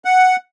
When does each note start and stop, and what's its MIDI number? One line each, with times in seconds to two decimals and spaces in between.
0.05 0.36 78